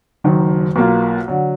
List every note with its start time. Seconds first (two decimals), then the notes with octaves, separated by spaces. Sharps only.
0.24 F#1 F#2 D#3
0.76 B1 B2 A#3 F4
1.28 D3 F#3